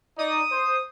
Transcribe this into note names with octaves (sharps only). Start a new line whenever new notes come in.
D#4 D5 D#6
C5